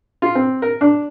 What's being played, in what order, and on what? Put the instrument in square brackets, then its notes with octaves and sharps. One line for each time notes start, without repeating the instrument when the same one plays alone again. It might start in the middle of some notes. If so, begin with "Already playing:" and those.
[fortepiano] F4
C4
A#4
D4